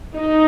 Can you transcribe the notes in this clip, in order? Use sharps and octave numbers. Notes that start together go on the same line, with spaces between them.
D#4